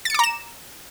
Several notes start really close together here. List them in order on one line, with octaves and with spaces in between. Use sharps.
A6 C#7 D6 A#5 E7